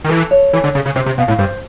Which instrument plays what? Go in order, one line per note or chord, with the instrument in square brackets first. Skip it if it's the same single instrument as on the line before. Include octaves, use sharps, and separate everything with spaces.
[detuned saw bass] D#3
[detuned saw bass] E3 [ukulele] A4
[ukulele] C#5
[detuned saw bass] E3 [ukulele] A4
[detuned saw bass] D3
[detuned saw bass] C#3 [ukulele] C#4
[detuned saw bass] C#3
[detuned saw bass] C3 [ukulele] C5
[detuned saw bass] C3
[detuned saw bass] B2 [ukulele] F5
[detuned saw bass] A2
[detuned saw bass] G2 [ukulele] C5